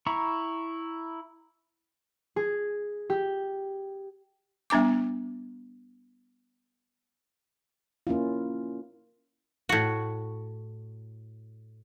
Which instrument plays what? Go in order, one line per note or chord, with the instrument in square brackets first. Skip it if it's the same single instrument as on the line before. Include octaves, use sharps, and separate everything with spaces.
[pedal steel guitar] E4 A#5 B5 C#6
[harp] G#4
G4
[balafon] G3 B3 D4 G#5 D6
[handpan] A#3 C#4 E4 F4
[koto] A2 F#4